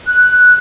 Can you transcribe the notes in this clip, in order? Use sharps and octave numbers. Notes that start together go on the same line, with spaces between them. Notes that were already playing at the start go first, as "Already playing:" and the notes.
F#6